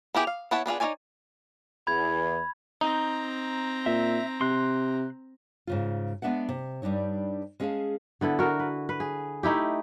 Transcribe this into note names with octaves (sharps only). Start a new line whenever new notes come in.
B3 E4 G4 G#4
F5
B3 E4 C#5 F#5 A5
B3 D4 F4 G#4
D#4 F4 C#5 D5 G#5
E2 B5 G#6
C4 D#4 A#5
A#2 E5
C3 C6 F#6
G#2 C#3 F4
G#3 B3 D4 E5 F#5
C3
G2 G3 D4 D#4 C#5
G#3 C#4 G#4 D#5 F5 A5
D3 B3 E4 A4
F#4 A#4
B4
B4
G#4
A3 D#4 E4 G4